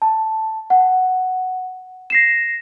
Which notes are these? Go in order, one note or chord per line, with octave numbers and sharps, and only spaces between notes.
A5
F#5
A#6 C7 E7